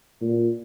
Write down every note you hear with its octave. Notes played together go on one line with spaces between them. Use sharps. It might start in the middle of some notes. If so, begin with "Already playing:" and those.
A#2